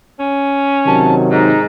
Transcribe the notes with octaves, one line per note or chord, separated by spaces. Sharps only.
C#4
C3 D#3 F#3 A5
G#2 D#4